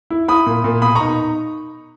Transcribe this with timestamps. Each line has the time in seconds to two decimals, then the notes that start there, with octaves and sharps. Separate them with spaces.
0.10 E4
0.28 E4 B5 D#6
0.46 A#2
0.64 A#2
0.82 B2 B5 D#6
0.95 A#5 C#6
1.00 D#4